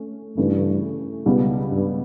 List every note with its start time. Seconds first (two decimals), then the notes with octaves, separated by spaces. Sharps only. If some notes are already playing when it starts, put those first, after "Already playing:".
Already playing: A3 C#4
0.37 G2 C#3 E3 A3
1.26 C#2 B2 G3 B3
1.71 G2